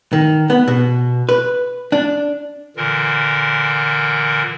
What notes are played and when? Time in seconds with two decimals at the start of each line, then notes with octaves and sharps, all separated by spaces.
0.13 D#3
0.50 B3
0.68 B2
1.29 B4
1.92 D4
2.76 A#2 D3 E3 A#4